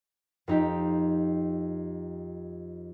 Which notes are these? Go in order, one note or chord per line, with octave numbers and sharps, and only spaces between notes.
F2 D#4 G4